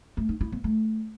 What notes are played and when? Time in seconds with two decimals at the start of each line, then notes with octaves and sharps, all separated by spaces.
0.17 A3
0.29 D#4
0.41 E4
0.52 B3
0.64 A3